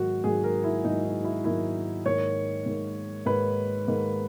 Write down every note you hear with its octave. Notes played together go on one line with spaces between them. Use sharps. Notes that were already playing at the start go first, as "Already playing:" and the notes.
Already playing: G#2 D#3 F#3 A#3 F#4
G#2 D#3 F#3 A#3 G#4
A#4
E4
G#2 D#3 F#3 A#3 D#4
D#4
E4
G#2 D#3 F#3 A#3 E4
G#2 D#3 A#3 C#5
G#2 D#3 A#3
G#2 D#3 A#3 B4
G#2 D#3 A#3